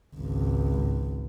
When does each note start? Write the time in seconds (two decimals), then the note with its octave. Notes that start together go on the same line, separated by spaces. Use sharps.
0.16 G#1 C#2